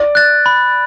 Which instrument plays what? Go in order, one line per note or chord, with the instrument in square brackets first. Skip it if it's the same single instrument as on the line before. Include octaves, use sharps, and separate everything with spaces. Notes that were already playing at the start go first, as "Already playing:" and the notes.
Already playing: [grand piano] D5
[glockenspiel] F#6 A6
B5